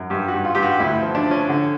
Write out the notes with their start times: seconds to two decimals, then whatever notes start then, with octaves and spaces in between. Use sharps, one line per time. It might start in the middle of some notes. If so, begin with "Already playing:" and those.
Already playing: F#2
0.10 G2 G4
0.28 F#4
0.34 G2
0.45 F4
0.55 G2 G4
0.63 F#4
0.80 D2 E4
1.02 F3
1.15 D4
1.26 F3
1.31 C#4
1.49 D3